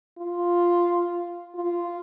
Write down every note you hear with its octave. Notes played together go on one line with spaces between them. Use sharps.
F4
F4